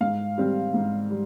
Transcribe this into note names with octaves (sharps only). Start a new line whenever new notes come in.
G#2 F5
G3 C4
G#2
G3